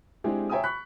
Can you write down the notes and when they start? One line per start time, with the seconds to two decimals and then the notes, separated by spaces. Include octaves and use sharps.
0.24 G#3 C4 D4 E4 G4 G#4
0.49 C#5 E5 G5 G#5 A#5 D#6
0.63 B5 C#6 F#6 B6